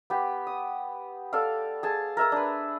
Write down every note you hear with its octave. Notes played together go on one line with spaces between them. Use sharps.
B3 G4
D#6
A4 D5 F5
G#4 A5
A#4 E5 A#5
D4 B4